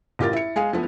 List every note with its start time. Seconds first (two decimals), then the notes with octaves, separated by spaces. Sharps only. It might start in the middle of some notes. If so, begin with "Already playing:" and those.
0.19 A1 F4 G4 A#4 A6
0.33 E4 C#7
0.56 G#3 G#4 F5
0.73 E2 F3 A3 B3 B4